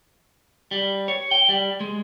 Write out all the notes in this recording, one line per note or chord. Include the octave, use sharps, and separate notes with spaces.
G3
C#5
G5
G3
G#3